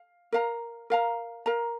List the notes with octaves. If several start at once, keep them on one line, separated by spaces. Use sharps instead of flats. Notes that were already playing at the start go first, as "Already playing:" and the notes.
Already playing: F5
A#4 F5 A#5
A#4 F5 A#5
A#4 F5 A#5